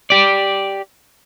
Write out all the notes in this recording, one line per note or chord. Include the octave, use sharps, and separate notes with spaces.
G4 D5